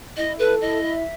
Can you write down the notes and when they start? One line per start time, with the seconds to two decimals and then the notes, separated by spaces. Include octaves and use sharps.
0.16 E4 D#5
0.39 A4 B4
0.61 E4 D#5
0.83 E5